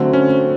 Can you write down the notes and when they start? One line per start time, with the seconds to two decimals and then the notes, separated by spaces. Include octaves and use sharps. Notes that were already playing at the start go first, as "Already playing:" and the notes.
Already playing: D3 F#3 A3 C4
0.13 C#4